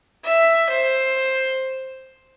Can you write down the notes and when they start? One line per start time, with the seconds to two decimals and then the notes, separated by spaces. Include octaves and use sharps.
0.25 E5
0.70 C5